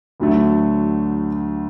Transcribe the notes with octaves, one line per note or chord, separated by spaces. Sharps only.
D2 D3 F#3 A3